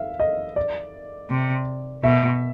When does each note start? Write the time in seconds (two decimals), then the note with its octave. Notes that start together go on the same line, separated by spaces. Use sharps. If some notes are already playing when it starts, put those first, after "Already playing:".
Already playing: E5 F5
0.20 D#5
0.56 D5
1.30 C3
2.03 B2 E5